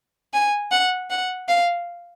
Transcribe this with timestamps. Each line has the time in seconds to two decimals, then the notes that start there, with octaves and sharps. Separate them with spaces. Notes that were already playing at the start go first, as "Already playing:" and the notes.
0.33 G#5
0.71 F#5
1.10 F#5
1.48 F5